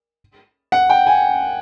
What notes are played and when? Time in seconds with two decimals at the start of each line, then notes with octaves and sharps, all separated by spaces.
0.72 F#5
0.90 G5
1.07 G#5